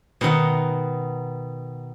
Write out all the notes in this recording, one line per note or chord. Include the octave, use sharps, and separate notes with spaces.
B2 D#3 D#4 F#5